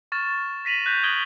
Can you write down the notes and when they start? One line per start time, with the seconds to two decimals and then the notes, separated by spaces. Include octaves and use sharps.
0.12 C#6 F6 A6 E7
0.65 A#6 B6 D#7 F7 F#7
0.86 F#6 G6 B6 F7
1.03 D#6 G#6 D7 F#7 G7